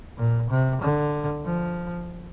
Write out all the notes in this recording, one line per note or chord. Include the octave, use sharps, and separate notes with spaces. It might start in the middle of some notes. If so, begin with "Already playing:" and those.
A#2
C3
D3
F3